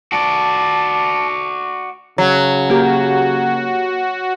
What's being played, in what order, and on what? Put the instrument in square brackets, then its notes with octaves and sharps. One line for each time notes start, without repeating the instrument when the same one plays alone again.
[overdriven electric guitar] F#4 D5 [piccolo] A5
[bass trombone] C#3 [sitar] F#3
[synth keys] A#3 G4 [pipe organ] F#4